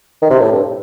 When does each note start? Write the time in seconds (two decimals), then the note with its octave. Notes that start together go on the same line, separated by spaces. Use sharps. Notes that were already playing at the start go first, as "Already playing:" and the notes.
0.22 D#3
0.30 C3
0.41 A2
0.53 G2